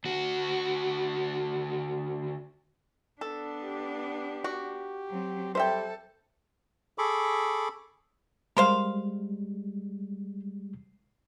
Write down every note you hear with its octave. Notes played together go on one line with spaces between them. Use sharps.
D2 F#4
B3 D4 A4
G4
F#4
F#3 C4
G3 A4 C5 E5 G5
G#4 A4 B5 C#6 D6
G3 G#3 A#4 C5 F5